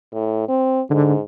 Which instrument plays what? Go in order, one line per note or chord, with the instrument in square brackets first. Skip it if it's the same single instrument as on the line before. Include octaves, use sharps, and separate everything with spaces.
[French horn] A2
C4
[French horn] G#2 [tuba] D3